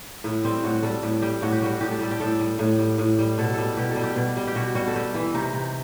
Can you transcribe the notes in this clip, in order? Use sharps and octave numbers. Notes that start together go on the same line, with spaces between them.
A2 E4
G3 C4
A2 F#4
G3 A4
A2 G4
G3 G4
A2 F#4
G4
G3 F#4
A2 G4
A4
G3 A4
G4
A2 A4
G3
A2
G3
A2
G3
B2 A4
G3 A4
B2 G4
A4
G3
G4
B2
G3
G4
B2 F#4
G3 F#4
A4
G3 G4
E3 E4
C3 D#4
C3